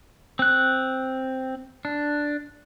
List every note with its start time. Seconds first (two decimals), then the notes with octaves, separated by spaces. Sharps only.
0.39 C4 F#6
1.85 D4